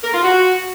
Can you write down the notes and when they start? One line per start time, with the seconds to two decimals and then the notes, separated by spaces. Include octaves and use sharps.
0.04 A#4
0.14 F4
0.23 F#4